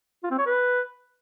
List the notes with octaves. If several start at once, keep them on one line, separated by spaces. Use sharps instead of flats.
F4
C4
C#5
B4